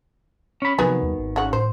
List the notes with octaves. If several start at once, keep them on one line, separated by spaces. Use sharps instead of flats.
C#4 B5
C3 D#3 F3 F#3 B3 F#4 G#4
D#2 G3
G#1
C#3 F#4
A2 C5